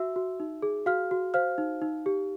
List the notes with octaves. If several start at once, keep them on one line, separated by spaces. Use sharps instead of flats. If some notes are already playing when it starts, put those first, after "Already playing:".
Already playing: F#4 E5 E6
F#4
D#4
G#4
F#4 F5 F6
F#4
C5 F5 F6
D#4
D#4
G4